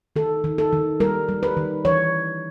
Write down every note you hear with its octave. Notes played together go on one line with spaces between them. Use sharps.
D#3 A4
D#3
A4
D#3
G3 A#4
G3
B4
D#3
E3 C#5